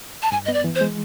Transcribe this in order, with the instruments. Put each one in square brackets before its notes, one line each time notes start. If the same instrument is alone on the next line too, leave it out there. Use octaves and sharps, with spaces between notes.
[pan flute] A5
[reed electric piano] G2 [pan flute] G#5
[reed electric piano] B3 [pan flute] D#5
[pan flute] D5
[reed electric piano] E3
[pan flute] C5
[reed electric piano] G#3